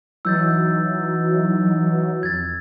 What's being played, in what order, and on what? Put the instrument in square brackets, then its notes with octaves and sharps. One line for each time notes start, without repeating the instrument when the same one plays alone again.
[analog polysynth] E3 F#3 D#4 [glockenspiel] E6 G6 A6
[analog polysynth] F2 [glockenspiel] G#6 A6